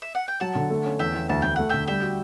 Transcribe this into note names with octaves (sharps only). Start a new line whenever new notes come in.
E5
F#5
G5
F#3 F#5 A5
D3
A3
C#4
E2 E5 G5
E2
D2 A5
D2 G5
A3 F#5
D3 E5 G5
G3 E5 G5
F#4